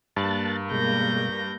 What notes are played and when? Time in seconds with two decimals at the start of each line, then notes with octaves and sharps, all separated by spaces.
0.16 G2 A#3 A5 F#6 A6
0.72 B2 G3 G#3 G6 A#6